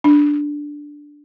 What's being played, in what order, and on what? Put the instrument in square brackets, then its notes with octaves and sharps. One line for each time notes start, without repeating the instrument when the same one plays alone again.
[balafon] D4